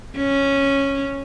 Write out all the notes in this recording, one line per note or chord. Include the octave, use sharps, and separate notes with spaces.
C#4